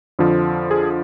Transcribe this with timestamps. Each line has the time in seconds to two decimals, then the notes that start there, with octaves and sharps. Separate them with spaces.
0.19 F2 D3 F3
0.71 G#4